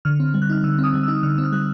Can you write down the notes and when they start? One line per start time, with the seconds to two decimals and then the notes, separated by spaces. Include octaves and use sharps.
0.05 D3 F6
0.20 C4
0.34 G3
0.42 F#6
0.49 D#4 F6
0.64 D3 E6
0.78 C4
0.84 D#6
0.94 G3
1.03 D#4 E6
1.23 D3 F6
1.38 C4 E6
1.45 F6
1.52 G3 F#6